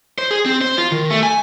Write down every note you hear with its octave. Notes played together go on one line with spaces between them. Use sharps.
C5
G#4
C4
C5
F4
D#3
A3
G#5